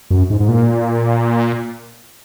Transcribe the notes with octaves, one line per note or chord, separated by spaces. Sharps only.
F#2
G#2
G#2
A#2